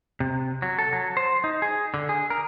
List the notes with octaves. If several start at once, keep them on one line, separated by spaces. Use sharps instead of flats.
C3
F#3
A4
F#3
C5
D#4
G#4
D3
G#4
A#4